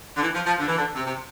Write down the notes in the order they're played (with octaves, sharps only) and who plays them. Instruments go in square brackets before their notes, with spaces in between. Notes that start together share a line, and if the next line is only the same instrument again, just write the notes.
[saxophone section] D3
E3
F3
F3
D3
E3
D3
C3
C3